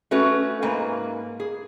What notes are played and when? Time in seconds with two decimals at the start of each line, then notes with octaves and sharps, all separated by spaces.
0.11 A3 C#4 F#4 B4
0.62 G#2 A#3 B4 G#5
1.40 G#4